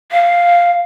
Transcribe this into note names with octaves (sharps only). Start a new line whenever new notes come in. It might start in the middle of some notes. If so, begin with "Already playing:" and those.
F5